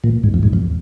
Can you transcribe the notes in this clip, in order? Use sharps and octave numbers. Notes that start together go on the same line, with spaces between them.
A#2
G#2
F2
G#2
F2